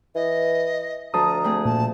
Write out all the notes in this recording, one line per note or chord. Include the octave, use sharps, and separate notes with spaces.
E3 D#5
D2 F3 F4 A5 A#5 D#6
A3 C4 G#4
A#2 A5